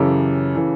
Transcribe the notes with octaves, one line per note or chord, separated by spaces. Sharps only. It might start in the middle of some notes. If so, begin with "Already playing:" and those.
Already playing: F#2 C#3 E3 G4 A4
C#3 E3